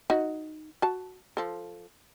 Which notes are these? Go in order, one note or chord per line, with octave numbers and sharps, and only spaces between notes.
D#4 F#4
F#4 A5
F3 A4